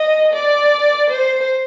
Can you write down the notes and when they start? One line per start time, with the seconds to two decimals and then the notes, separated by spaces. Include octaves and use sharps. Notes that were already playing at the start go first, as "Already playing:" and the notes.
Already playing: D#5
0.34 D5
1.11 C5